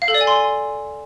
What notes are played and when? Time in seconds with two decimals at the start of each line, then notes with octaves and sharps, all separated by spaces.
0.02 F5
0.08 A4
0.14 D5
0.21 G#5
0.27 C6